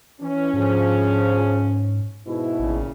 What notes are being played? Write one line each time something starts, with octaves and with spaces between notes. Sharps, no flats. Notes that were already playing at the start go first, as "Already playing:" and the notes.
E3 C#4
G#2 D3 F3 G#4
G#2 B2 E4
A1 A#2 C#3